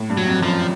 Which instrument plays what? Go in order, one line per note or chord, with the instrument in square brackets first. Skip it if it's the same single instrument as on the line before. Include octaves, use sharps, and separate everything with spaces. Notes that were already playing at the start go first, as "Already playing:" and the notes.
Already playing: [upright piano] A2
G2
[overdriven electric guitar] F#3
[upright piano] F2
[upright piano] F#2 [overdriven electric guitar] F3